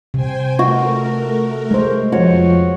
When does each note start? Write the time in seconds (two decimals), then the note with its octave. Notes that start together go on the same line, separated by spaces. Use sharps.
0.14 C3 C5 G5 G#5
0.59 A3 F#4 A#4
1.71 G#3 C5
2.12 F2 F3 F#4 C#5